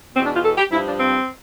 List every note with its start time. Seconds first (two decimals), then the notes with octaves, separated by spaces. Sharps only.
0.14 E2 B2 C4
0.24 D4
0.34 F4
0.44 A4
0.57 G4
0.71 G2 F3 E4
0.86 D4
1.00 C4